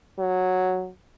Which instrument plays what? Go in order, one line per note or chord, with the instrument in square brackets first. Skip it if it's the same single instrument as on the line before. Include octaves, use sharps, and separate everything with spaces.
[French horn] F#3